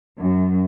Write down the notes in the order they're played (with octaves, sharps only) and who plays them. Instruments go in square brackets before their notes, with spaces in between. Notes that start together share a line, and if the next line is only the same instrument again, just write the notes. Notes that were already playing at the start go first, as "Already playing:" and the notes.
[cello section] F#2